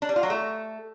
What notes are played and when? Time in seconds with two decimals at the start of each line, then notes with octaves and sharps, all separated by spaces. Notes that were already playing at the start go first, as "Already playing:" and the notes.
0.02 D4
0.09 G3
0.16 F4
0.23 F#3
0.30 A3